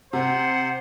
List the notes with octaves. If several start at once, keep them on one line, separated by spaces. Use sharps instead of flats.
C3 C5 F#5